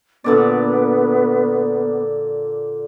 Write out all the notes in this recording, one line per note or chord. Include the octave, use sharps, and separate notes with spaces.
A#2 D3 B3 D5